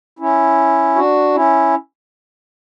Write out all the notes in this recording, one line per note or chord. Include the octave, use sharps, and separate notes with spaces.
C#4 E4
D4 F#4
C#4 E4